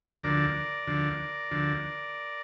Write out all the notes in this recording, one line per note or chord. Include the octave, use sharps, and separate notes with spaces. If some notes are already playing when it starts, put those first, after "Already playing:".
D2 D3 F3 A#4 D5
D2 D3 F3
D2 D3 F3